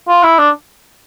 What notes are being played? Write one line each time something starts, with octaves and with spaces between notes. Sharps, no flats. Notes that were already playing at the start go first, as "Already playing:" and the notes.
F4
E4
D4